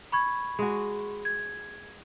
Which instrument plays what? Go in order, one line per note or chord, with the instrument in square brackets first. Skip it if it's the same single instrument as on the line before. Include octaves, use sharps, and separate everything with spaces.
[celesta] B5 C#6 G#6
[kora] G#3 F#4
[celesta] G#6